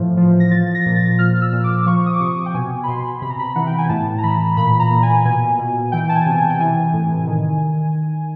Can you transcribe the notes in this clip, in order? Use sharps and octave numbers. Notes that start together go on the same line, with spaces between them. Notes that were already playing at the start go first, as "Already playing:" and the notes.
Already playing: A2 E3 F3
F3
A#6
F3 A6
A#6
A#2
A6
F3 F6
E6
A#2
D6
D6
F3 C#6
D#6
D6
C3 C#6
G5
B2 G#5
B5
B2 C6
C3 B5
A#5
B5
E3 F#5
G5
G#5
A2 A5
A#5
E3 B5
A#2 B5
A#5
A#2
G#5
B2 G#5
B2
E3 G5
A5
G#5
C3
G#5
G5
E3 G#5
A2
D#3